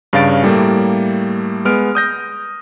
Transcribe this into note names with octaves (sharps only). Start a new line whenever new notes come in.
G2 C#3 C#4 F5 A6 D7
A2 G3 A3 A#3
G#3 B3 F6 D7
D#6 G6 A#6